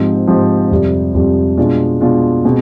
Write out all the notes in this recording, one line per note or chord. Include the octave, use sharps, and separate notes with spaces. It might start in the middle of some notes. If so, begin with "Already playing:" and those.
Already playing: G#2 F3 C4 D#4 G4
G#2 F3 C4 D#4 G4
F2 C3 G3
F2 C3 G3
B2 G#3 D4 F4
B2 G#3 D4 F4
B2 G#3 C4